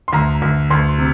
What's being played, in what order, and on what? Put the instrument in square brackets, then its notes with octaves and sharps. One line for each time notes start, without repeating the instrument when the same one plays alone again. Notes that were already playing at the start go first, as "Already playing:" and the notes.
[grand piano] C6
D2 A#5
D2
D2 C6
C3